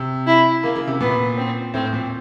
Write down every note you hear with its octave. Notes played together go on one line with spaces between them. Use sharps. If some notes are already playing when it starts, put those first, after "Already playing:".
Already playing: C3
E4
C#3 A#3
C#3
C3
A#2 B3
C4
A2 C4
A#2